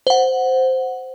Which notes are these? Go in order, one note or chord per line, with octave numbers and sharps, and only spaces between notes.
C5 F#5